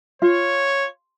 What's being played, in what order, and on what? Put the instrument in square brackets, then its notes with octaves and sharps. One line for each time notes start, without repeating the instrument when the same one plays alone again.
[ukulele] F4 [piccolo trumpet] C#5